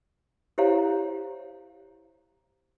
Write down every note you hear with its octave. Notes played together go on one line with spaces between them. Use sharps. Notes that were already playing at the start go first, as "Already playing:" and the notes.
E4 G4 C5 C#5 F5 A#5